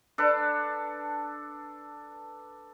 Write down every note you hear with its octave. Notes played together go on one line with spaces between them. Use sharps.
D4 A4 B4